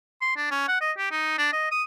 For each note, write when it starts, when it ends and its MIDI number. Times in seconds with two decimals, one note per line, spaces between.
0.21 0.35 84
0.36 0.46 62
0.51 0.64 61
0.68 0.76 78
0.81 0.92 75
0.98 1.08 67
1.11 1.34 63
1.38 1.48 62
1.52 1.67 75
1.71 1.83 87